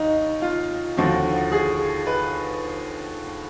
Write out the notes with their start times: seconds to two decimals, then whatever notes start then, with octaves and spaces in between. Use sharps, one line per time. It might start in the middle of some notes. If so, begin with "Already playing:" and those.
Already playing: D#2 D#4
0.42 F4
0.97 D#2 D3 F3 F#4
1.52 G#4
2.07 B4